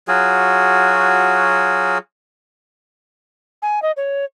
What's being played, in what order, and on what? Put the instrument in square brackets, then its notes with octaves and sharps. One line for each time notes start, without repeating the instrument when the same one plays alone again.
[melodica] F#3 F4 F#4 G#4
[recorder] G#5
D#5
C#5